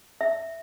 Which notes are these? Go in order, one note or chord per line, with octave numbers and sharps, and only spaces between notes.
E5